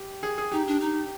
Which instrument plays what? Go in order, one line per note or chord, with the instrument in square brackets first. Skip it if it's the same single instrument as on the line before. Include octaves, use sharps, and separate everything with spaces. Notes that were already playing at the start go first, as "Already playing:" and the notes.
Already playing: [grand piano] G4
G#4
G#4
[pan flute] D#4 [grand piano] G4
[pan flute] D4
D#4